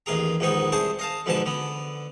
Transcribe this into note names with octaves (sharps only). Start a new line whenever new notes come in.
A1 D#2 F4 G#4 A#5
A#1 D#2 G#2 B3 D#4 C#6
C2 G#4 C5 A5 C#6
D#5 F5 A5
F2 G#2 B2 D3 G#5 A5
D3 B3